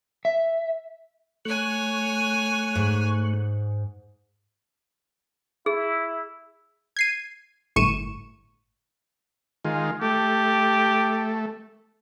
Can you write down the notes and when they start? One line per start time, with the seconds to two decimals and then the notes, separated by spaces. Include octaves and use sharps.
0.25 E5
1.45 A3 C#5 G#5 C#6 F#6
2.75 G#2
5.66 E4 G#4
6.97 G#6 C7 D#7
7.76 G1 A2 C#6 C#7 D#7 E7
9.65 D#3 G#3 F4
10.02 A3 G4